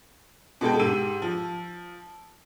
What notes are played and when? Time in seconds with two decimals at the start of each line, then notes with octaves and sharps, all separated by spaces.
0.61 B2 G#3 A4 G5
0.79 G#2 G4 E6 D#7
1.22 F3